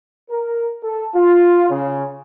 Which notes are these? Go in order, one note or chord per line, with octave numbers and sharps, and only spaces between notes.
A#4
A4
F4
C#3